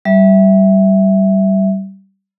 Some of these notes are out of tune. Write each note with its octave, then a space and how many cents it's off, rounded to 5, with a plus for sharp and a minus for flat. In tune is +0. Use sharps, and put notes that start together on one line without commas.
G3 -20 E5 +0